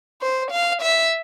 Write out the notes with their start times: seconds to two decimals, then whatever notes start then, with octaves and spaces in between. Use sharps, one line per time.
0.22 C5
0.51 F5
0.82 E5